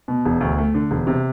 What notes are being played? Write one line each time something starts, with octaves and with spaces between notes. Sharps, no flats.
B2
E1
D2
A3
D3
E1
C3